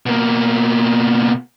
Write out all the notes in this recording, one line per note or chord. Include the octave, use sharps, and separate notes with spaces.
B2 A#3